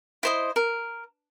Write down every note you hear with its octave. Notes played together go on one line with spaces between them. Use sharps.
E4 C5 D#5
A#4